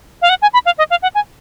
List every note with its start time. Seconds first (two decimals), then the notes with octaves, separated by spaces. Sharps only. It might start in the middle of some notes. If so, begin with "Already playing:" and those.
0.22 F5
0.29 F#5
0.42 G#5
0.53 B5
0.66 F5
0.78 D#5
0.90 F5
1.03 F#5
1.15 G#5